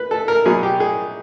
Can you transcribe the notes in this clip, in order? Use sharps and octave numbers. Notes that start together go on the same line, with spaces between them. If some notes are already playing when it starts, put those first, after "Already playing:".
Already playing: B4
A4
A#4
B2 F#3 G#4
G4
G#4